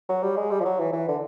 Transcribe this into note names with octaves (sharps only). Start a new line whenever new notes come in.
F#3
G3
G#3
G3
F3
F#3
E3
E3
D3